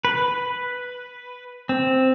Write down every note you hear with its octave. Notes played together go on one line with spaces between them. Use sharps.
B4
C4